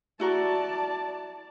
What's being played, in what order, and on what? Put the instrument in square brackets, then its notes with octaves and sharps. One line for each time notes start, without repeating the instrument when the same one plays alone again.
[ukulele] E4 F#4 A#4 [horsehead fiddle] D5 A5